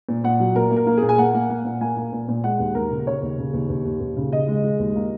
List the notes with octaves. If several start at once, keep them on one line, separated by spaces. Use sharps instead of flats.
A#2
A#2 F#5
F#3
A#2 A#4
A#3
A#4
A#3
A#2 G#4
G#5
A#3 F#5
A#3
A#3
A#2
A#3 G#5
A#3
A#2
A#2
G#3 F#5
D#2
D#2 A#4
C#3
C#3 C#5
D#2
C#3
D#2
D#2
D#2
D#2
C#3
C#3 D#5
G#3
G#3
D#2
A#3